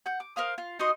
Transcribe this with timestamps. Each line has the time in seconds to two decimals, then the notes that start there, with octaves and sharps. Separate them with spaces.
0.06 F#5 G6
0.20 D6
0.36 A#4 C5 F5 D#6
0.58 F4
0.79 D#4 F#4 D#5 C6